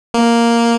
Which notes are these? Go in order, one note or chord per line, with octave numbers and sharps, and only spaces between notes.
A#3